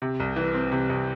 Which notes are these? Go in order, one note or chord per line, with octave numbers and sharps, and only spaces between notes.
C3
C2
E3
C4
C3
C2